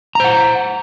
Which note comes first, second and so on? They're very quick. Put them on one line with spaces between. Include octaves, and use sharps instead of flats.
A#5 C5 F#5